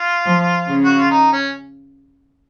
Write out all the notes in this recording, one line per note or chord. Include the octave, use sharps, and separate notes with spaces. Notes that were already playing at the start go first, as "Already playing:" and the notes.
Already playing: F4
F3
C#3
F#4
F4
D#4
C#4